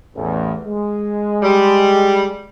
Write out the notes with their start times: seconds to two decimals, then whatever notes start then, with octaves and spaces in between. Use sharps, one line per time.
0.15 A1 E2
0.65 G#3
1.43 G3